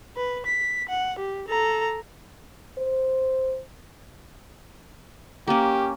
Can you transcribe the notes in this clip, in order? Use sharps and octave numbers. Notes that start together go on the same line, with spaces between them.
B4
B6
F#5
G4
A4 A#5
C5
A#3 C#4 G4